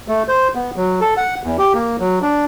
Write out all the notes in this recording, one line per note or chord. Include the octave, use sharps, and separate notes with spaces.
A3
C5
B3
F#3
A4
F#5
E2
G4
A#3
F#3
D4